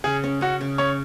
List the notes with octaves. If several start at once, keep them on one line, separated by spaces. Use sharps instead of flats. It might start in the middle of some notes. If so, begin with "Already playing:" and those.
C#3 G#4
C#4
C#4 F#4
C#3
C#4 C#5